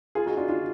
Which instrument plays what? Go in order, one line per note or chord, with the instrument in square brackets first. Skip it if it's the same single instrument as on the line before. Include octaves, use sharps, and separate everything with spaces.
[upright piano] F4 G#4
D#4 F#4
D4 F4
D4 F4